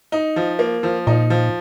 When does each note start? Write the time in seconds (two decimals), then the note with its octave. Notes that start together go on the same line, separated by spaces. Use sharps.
0.12 D#4
0.36 F3
0.59 A#3
0.83 F3
1.07 A#2 D#4
1.30 F3